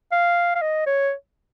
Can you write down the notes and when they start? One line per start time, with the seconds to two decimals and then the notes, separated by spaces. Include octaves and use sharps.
0.12 F5
0.55 F5
0.62 D#5
0.86 C#5